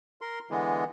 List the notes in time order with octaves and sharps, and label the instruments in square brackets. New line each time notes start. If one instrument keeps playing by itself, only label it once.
[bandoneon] A#4 C6
D3 E3 G#3 B3